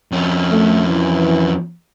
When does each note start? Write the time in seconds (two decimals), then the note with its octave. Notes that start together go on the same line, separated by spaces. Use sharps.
0.12 F2 C#4
0.51 A3
0.88 E3